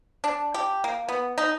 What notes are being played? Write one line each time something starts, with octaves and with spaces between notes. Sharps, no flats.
D4
G4
A#3
B3
D#4